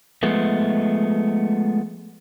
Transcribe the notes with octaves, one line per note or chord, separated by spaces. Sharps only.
F3 G#3 A3 B3